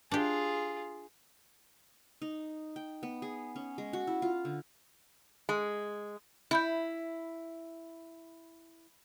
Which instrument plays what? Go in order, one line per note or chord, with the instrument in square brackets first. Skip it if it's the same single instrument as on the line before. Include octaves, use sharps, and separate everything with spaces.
[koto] D4 G4 [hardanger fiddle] F4 G#4
[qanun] D#4
G5
B3
G#4
C#4
G#3
F#4
E4
F4
D3
[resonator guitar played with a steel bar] G#3
[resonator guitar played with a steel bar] E4 [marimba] E5 B5 G6